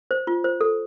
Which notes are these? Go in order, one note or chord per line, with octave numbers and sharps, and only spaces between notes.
C5
F4
C5
A4